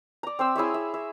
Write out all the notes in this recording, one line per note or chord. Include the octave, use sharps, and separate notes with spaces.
D5 A#5
C4 C5 E6
E4 G#4 C#5 E5
E5
E5